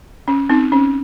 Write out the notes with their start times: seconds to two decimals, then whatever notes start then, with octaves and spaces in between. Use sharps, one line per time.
0.28 C#4
0.50 C4 D#4
0.72 C#4